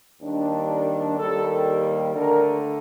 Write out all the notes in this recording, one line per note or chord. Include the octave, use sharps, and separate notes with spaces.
D#2 D#3 G3 D4
A#4
D#2 D#3 G3 A#3 A4
D3 A3 D4 A#4